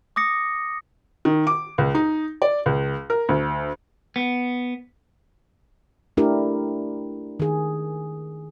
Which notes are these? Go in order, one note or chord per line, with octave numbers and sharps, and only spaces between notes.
D6 D#6 A#6 C#7
D#3
D6
C#2
D#4
D5
C#2
A#4
D2
B3
A3 D4 E4 G4 A#4
D#3 G#4